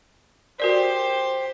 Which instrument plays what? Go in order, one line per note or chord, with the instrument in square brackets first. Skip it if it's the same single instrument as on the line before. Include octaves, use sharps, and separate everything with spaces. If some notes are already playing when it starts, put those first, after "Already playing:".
[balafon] F#4 A#4 D5 [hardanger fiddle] G4 C5